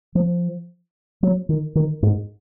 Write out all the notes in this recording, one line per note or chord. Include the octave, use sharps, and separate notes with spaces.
F3
F#3
D#3
D#3
G#2